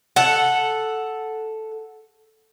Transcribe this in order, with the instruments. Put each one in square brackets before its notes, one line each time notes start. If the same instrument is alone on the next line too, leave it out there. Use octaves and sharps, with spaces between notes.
[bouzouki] A4 F#5